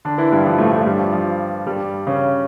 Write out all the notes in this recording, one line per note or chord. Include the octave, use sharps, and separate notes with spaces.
D3 D4
E3 E4
G2 G3
F3
A2 A3
A2 A3
G2 G3
F3
F3
G2 G3
C#3 C#4